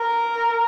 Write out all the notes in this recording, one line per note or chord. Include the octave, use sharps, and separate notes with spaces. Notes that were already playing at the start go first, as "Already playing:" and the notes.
Already playing: A#4